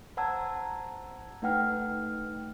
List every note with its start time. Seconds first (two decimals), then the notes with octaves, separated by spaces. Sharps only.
0.17 C5 F#5 A5 A#5 E6 G#6
1.42 A3 D#4 B4 F#5 G5 F6